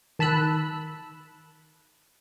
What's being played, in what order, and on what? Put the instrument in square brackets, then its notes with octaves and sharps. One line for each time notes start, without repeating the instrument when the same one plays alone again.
[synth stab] D#3 A5 B5 E6 F#6